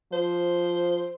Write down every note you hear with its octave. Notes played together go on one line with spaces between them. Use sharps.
F3 C5